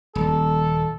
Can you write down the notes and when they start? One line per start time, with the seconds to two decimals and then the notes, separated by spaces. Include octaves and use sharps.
0.15 D#1 A4